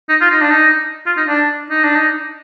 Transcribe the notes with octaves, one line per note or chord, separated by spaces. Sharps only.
D#4
F4
D#4
D4
D#4
F4
D#4
D4
D#4
D4
D#4